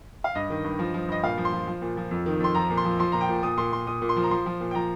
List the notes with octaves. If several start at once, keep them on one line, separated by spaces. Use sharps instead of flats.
F5
G2 D#5
D#3
G2
F3
F3
G2 D#5
A#2 F5
F3
C6
F3
F3
A#2
F3
F2
D#3
F2 C6
F3 A#5
A#2
C6
F3
F3 C6
A#2 A#5
G5
A#2
A#2 D#6
A#2 C6
A#2 C6
A#2 D#6
A#2
C6
F3
A#5
F3 C6
F3
A#2
G5
F3 A#5